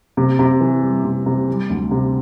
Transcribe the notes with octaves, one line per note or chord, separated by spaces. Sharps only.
C3
C3
E3
G3
C3
C3
G3
D2
C3